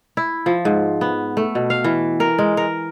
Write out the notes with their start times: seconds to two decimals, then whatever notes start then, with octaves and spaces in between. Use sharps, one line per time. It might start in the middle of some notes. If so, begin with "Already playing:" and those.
0.17 E4
0.46 F3
0.65 G#2
1.01 B3
1.37 A3
1.55 B2
1.70 F5
1.84 E3
2.20 A#4
2.38 G#3
2.57 A#4